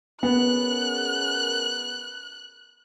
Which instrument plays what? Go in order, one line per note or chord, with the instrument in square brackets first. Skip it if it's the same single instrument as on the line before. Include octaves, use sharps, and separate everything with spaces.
[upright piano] B3 [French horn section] C#4 G#4 A#4 [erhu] F#6